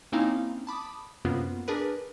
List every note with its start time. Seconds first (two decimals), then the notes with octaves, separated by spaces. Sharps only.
0.12 A#3 C4 C#4 D#4 E4 F5
0.67 A5 B5 D6 D#6
1.25 F#2 C3 A#3 B3 F4
1.68 D4 G#4 A#4 B4